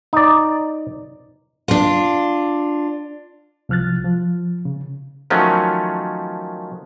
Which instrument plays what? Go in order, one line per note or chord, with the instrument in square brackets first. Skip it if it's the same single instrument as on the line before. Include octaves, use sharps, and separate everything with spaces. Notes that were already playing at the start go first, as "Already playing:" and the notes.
[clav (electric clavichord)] D#4 D5
[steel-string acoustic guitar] D4 F4
[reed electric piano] C2 F3 F6 F#6 A6
F3
C#3
[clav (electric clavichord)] D#3 F3 F#3 A3 C#4